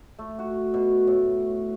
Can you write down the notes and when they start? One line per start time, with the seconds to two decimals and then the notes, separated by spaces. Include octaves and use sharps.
0.19 A3
0.39 F#4
0.74 B2
1.07 A2